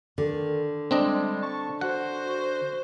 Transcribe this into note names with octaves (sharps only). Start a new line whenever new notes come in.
D3 D#3
G3 G#3 C4 D4 D#5
A5 C#6
F#4 C5 F#5